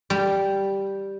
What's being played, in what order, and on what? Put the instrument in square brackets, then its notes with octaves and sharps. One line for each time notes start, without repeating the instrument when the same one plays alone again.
[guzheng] G3